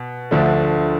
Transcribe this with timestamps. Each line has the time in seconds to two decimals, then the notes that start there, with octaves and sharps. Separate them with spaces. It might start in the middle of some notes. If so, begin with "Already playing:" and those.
Already playing: B2
0.31 D2 D3 F3 A3 D4